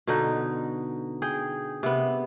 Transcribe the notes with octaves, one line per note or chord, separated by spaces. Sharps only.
B2 D3 D#4
G#4 G5
C3 B3